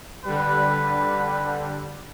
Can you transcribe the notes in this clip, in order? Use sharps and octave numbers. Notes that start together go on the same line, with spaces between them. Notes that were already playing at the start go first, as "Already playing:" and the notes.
D3 G3 B4